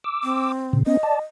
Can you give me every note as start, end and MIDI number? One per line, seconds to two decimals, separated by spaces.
0.04 0.52 86
0.04 0.52 88
0.23 0.75 60
0.73 0.83 46
0.73 0.83 49
0.86 0.97 59
0.86 0.97 61
0.86 1.21 75
1.03 1.19 74
1.03 1.19 81